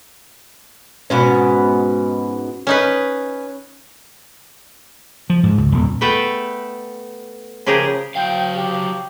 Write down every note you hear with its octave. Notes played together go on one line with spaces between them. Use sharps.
G#2 B2 C#4
C#4 D#4 B4
F3
G#2
C#2
D#1
A3 B3 A4 B4 G5
C#3 F3 G4 G#4 A#4
F#3 F5 G5
G4